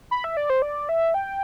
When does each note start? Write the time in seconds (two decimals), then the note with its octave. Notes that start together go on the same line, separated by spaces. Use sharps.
0.11 B5
0.24 E5
0.37 D5
0.50 C5
0.62 D5
0.89 E5
1.14 G5